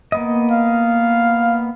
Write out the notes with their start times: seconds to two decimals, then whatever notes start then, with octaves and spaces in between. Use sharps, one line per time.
0.12 A#3 B3 D#5
0.51 F5